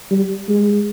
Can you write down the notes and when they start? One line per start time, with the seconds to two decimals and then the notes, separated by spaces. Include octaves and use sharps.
0.11 G3
0.49 G#3